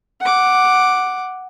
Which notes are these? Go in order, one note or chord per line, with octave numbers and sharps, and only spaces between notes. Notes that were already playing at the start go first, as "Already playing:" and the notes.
F#5 D6